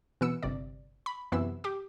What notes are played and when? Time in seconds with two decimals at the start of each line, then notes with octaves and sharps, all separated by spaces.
0.21 B2 E3 B3 E6 C#7
0.43 G1 C3 D5
1.06 B5
1.32 F#2 C3 E3 B3 E5 E6
1.64 G4 D6